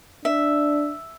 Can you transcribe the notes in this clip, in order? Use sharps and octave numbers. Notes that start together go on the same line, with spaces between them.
D4 E5